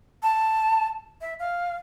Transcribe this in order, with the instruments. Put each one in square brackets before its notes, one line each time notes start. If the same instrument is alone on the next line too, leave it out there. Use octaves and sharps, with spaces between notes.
[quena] A5
E5
F5